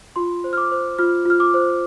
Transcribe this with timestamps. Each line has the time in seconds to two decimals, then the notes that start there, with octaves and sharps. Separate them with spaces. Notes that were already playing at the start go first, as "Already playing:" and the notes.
0.16 F4 C6
0.44 C5
0.53 F6
0.57 D6
0.72 C5
0.99 F4 F6
1.25 F4 F6
1.40 D6
1.54 C5